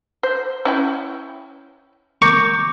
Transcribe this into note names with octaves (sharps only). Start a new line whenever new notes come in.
C5
C#4 E4 G5
A#4 C#6 D6 G6